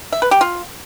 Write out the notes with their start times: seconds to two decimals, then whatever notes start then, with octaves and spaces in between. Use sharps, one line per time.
0.12 E5
0.22 B4
0.31 G4
0.41 F4